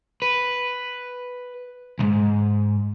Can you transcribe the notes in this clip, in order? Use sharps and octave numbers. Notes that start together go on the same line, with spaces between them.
B4
C#2 G#2